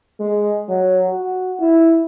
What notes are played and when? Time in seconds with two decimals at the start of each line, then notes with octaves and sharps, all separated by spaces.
0.20 G#3
0.69 F#3
1.10 F#4
1.60 E4